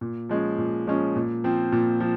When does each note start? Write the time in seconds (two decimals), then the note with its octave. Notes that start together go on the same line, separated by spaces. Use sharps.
0.01 A#2
0.29 F3 G#3 C#4
0.58 A#2
0.87 F3 G#3 C#4
1.16 A#2
1.44 F3 C4
1.72 A#2
2.00 F3